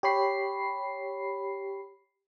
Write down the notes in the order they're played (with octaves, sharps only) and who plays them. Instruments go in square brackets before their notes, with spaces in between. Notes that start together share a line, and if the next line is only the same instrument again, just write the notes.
[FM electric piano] G4 C#5 B5 C7